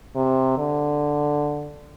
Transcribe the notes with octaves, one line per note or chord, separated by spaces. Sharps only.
C3
D3